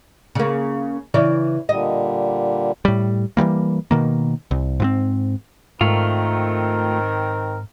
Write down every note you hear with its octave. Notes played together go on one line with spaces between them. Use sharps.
C#3 A#3
C#3 E3 D5
A#2 D3 G3 D#5
A2 G3
E3 F3 G3 A#3
B2 D#3 A#3
C2
G#2 E3 C4
G#2 D#3 A3 C4 F4 A#4